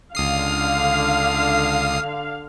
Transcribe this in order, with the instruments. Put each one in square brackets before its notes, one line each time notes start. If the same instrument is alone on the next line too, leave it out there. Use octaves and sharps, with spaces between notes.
[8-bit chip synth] C#2 D#6 C7 [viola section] D3 F5